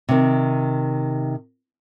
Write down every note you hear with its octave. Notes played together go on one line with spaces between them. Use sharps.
C3 D#3